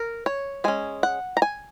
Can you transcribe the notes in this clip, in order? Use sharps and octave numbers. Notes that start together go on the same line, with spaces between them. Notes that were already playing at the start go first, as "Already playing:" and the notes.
Already playing: A#4
C#5
G#3 C#4 G#5
F#5
A#5
G#5